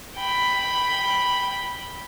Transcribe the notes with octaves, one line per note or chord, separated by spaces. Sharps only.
G5 B5